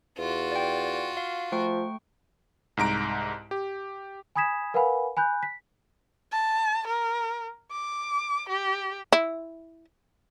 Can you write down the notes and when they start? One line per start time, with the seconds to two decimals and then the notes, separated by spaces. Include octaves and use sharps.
0.18 E2 F4 F#4
0.52 D5 G5
1.17 F5
1.52 F3 A3 G5 C#6
2.77 C2 G#2 A#5 D7
3.51 G4
4.35 G#5 B5 D#6 G#6 B6 E7
4.74 A#4 B4 F5 F#5 G#5 B5
5.17 G#5 B5 F#6 G6
5.43 B6
6.32 A5
6.87 A#4
7.72 D6
8.49 G4
9.13 E4